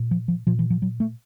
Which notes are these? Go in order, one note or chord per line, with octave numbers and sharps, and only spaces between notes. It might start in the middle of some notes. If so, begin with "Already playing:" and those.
Already playing: A#2
F3
F3
A#2 F3
E3
F3
F#3
A3